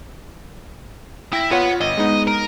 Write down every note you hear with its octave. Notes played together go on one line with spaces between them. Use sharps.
E4 G5 A#6
B3 F4 C#5 F#5
G1 D#5
G#3 B3 D#4
A#4